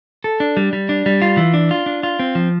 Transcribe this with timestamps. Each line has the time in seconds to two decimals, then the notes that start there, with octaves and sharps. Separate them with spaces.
0.24 A4
0.40 D4
0.57 G3
0.73 G3
0.89 D4
1.06 G3
1.22 F4
1.37 E3
1.54 D4
1.71 F4
1.86 D4
2.03 F4
2.19 C4
2.35 F3